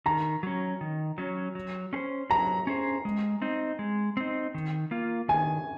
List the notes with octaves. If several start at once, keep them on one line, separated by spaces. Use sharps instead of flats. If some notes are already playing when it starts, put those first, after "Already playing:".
D#3 A#5
F#3 C#4
D#3
F#3 C#4
F#3
C#4 G#4 C5
F#3 A#5
C#4 G#4 C5
G#3
C4 D#4
G#3
C4 D#4
D#3
A#3 F4
D#3 G#5